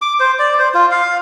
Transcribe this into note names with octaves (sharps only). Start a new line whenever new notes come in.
D6
C5
D5
C5
F4
F5